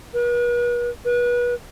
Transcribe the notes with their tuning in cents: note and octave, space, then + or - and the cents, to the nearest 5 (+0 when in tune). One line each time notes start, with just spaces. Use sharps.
B4 -40
B4 -30